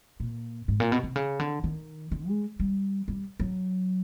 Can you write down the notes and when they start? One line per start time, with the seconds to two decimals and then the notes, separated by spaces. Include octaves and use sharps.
0.20 A#2
0.68 G#2
0.80 A#2
0.92 B2
1.04 C3
1.16 C#3
1.40 D3
1.64 D#3
2.12 D3
2.28 G#3
2.60 G3
3.08 G3
3.40 F#3